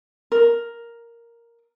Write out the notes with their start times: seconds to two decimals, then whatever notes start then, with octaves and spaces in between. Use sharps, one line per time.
0.32 A#4